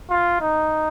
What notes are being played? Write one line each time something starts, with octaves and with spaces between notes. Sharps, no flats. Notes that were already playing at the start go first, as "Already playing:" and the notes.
F4
D#4